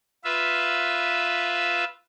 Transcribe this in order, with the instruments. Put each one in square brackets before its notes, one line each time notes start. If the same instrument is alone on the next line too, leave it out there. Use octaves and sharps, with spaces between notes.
[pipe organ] F4 B4 E5